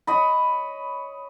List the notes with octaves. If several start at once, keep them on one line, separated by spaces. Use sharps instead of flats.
C#5 D#5 B5